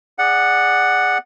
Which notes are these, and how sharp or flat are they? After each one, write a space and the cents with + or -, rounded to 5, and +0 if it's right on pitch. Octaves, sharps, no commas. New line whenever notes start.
G#4 -25 D5 +10 F#5 +0